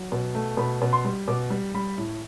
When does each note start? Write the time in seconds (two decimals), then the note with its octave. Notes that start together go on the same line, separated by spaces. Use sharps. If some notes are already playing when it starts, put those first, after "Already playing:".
Already playing: F#3
0.12 B2
0.35 A3
0.57 B2 B5
0.82 B2
0.93 C6
1.05 G3
1.28 B2 D6
1.50 G3
1.74 G3 B5
1.98 A2